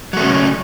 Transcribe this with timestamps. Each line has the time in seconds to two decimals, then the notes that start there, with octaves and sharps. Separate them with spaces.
0.13 F#3
0.17 A3
0.20 C#3
0.24 C#4